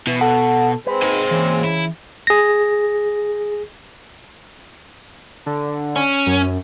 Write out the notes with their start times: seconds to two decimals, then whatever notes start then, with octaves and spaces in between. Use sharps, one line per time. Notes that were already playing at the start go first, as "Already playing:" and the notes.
0.07 B2 E3 E4
0.21 A4 F#5
0.87 G#3 C4 B4 C5
1.02 G#2 A#3 G#5
1.31 C#3 E3
1.64 E4
2.27 G#4 A#6
5.46 D3
5.96 C#4
6.26 F#2